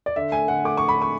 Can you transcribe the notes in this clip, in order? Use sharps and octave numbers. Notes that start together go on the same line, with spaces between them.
D5
D3 E5
A3 G#5
D3 F#5
A3 D6
A3 C#6
B5
D3 C#6